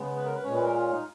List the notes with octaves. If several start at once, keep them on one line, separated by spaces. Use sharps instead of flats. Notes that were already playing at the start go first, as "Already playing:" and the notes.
Already playing: C#3 G#3 B3
B4
A#4
B4
A#2 G#3 C#4 C#5
B4
A#4
F4
D#4